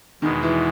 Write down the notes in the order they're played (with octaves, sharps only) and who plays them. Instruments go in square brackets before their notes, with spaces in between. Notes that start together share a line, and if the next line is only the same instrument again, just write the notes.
[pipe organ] E2 B2 G#3 [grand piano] D#3
[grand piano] E3